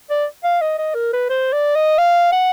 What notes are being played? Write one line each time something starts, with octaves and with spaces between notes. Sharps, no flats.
D5
F5
D#5
D#5
A#4
B4
C5
D5
D#5
F5
F#5